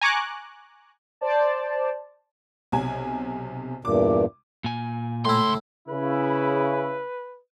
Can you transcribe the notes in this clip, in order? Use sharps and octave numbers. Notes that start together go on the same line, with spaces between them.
G#5 A#5 C#6 D6 F#6
C5 D5 A5
B1 C3 G#5
E2 G2 A#2 D6
A#2 G#5
C#2 A2 E4 C6
C#3 E4 B4